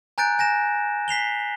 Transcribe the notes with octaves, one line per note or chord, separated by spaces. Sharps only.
G#5 A#5 F#6 G6 A6 D7
G#5 A#6 E7
B6 C7 F7 G7